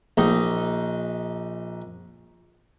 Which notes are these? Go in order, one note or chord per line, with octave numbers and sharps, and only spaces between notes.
A#1 D#4